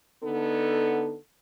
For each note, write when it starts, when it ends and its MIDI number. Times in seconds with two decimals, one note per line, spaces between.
0.24 1.15 50
0.24 1.15 59
0.24 1.15 63
0.24 1.15 69